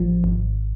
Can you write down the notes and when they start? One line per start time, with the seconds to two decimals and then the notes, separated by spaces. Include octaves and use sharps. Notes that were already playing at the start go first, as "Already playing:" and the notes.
Already playing: A1 F3
0.24 G#1